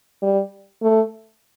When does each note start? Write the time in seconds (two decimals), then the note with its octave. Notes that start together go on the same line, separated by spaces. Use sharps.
0.22 G3
0.83 A3